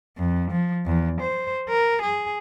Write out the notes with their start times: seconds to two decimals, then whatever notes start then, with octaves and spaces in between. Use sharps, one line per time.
0.18 F2
0.51 F3
0.86 E2
1.21 C5
1.69 A#4
2.02 G#4